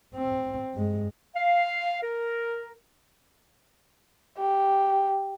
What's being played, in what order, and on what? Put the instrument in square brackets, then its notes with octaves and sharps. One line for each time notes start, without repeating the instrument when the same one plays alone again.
[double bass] C4
G2 G#3
[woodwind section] F5
A#4
[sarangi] G4